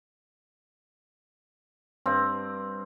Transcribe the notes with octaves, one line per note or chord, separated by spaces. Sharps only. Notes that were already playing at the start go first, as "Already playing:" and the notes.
G2 C4